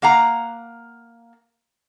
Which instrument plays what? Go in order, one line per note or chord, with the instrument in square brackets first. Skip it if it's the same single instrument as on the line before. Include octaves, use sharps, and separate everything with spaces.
[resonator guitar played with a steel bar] A#3 F5 F#5 A#5